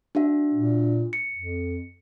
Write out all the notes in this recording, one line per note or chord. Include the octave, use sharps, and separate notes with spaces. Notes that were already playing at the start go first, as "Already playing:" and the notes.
D4 F#4 E5
A#2
C#7
F2